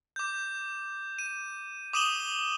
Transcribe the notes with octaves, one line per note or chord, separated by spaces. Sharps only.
D6 G6
D#7
D6 D#6 D#7 E7 F#7 G7